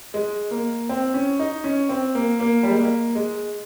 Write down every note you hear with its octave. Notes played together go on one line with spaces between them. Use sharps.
G#3
A#3
C4
C#4
D#4
C#4
C4
A#3
A#3
G3
G#3
A#3
G#3